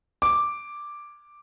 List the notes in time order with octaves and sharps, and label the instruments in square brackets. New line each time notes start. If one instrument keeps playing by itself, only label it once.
[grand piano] D6